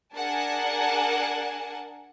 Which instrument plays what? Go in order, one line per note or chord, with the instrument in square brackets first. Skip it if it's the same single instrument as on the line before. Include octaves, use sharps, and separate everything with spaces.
[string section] D4 G#4 A#4 F#5 G#5 A5